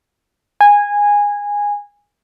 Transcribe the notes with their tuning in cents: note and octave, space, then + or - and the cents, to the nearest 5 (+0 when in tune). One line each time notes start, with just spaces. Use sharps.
G#5 -15